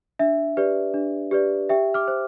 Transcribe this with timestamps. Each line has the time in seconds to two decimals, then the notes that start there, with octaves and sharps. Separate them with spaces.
0.19 D4 E5
0.57 G4 B4 D5
0.94 D4
1.31 G4 B4 D5
1.69 G4 E5 G5
1.94 D6 F6
2.08 C5